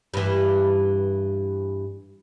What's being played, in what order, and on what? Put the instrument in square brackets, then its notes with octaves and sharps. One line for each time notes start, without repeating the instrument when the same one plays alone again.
[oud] G2 E3